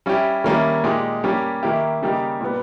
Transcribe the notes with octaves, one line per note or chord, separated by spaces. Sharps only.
G3 C#4 E4 G4
D#3 G3 A#3 C#4 E4
A#2 G#3 D#4 G4
G3 A#3 C#4 G4
D#3 A#3 E4 G4
C#3 G3 A#3 D#4 G4
A#2 G3 B3